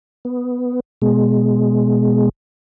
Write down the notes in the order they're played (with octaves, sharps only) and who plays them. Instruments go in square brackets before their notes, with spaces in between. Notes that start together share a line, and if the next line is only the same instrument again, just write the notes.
[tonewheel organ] B3
B2 G#3